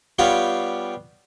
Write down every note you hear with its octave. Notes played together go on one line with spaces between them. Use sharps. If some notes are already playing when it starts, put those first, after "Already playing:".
G3 B3 F4 G4 C#5 F5